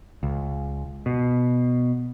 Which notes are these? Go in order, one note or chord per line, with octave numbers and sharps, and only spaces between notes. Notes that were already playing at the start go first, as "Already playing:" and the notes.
C#2
B2